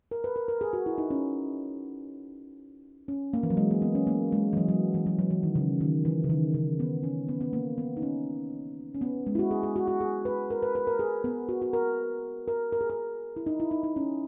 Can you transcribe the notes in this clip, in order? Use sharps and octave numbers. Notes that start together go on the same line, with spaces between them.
A#4
B4
A#4
A#4
G#4
F#4
E4
D#4
C#4
C#4
A#3
E3
F#3
G#3
A#3
B3
C#4
A#3
G#3
E3
F#3
F#3
E3
F#3
F#3
E3
D#3
C#3
D#3
E3
C#3
D#3
C#3
B3
C#4
B3
B3
A#3
B3
D#4
C#4
C#4
B3
G#3
E4
F#4
G#4
G#4
F#4
F#4
G#4
B4
A#4
B4
B4
A#4
G#4
B3
F#4
F#4
A#4
A#4
A#4
G#4
A#4
E4
D#4
E4
D#4
D#4
C#4